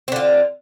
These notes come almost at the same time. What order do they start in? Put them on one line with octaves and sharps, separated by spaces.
C4 D3 F4